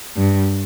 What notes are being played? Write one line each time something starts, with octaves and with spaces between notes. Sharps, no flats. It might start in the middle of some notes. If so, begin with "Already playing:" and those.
G2